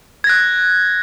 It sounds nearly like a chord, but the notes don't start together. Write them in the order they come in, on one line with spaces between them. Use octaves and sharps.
G#6 A#6 F#6